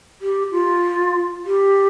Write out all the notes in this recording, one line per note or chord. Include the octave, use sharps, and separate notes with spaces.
G4
F4
G4